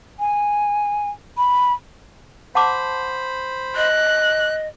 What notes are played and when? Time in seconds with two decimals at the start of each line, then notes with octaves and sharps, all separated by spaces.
0.19 G#5
1.37 B5
2.55 C5 F#5 A5 B5 D6
3.76 D#5 F#6